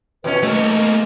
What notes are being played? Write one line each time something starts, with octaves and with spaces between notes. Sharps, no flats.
E2 B2 C#4 B4
G#2 A3 A#3 D#5